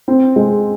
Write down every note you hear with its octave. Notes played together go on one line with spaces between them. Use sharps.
C4
G#3